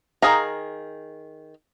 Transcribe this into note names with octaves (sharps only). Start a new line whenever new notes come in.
D#3 F#3 G#4 F5 A#5